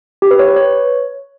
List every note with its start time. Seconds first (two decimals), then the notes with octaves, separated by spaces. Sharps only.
0.22 G4
0.31 B4
0.39 C#5
0.48 B4
0.56 C#5